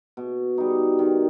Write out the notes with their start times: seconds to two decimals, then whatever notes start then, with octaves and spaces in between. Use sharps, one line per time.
0.17 B2
0.58 G3 D#4
0.99 D#3